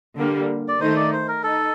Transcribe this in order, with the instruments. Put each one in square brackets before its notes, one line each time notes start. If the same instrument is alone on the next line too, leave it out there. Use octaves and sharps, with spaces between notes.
[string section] D3 G3 A#3
[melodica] D5
[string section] D#3 A3 D#4 [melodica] C5
[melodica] D5
C5
A#4
[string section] D#4 [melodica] A4